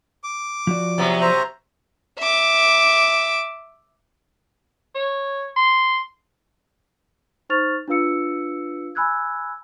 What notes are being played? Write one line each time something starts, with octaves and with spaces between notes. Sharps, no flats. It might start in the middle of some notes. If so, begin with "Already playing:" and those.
D6
F3 F#4 D5
C3 F#3 B3
C5 E5 A#5
E5 D6
C#5
C6
D#4 C5 C#6 F6 A6 F7
D4 F4 B4 F5 E6 C#7
G#5 B5 E6 F#6 G#6